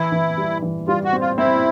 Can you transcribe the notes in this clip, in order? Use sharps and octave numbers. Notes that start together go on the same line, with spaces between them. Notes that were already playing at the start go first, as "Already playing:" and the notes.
Already playing: E3 E4
E3
G3
E3
G3 F4
F#4
C4
F4
C4 E4